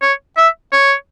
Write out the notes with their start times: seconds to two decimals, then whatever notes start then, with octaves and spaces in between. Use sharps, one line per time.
0.02 C#5
0.37 E5
0.72 C#5